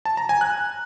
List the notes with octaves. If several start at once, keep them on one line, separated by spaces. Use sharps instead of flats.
A5
A#5
G#5
F#6